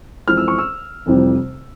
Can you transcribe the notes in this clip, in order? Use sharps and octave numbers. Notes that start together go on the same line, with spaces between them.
F2 E3 G#3 F6
E6
C#6
E6
F1 F2 C3 E3 G3